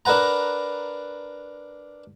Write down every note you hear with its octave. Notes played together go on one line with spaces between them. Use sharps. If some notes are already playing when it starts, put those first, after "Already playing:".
D4 A#4 B4 F#5 A#5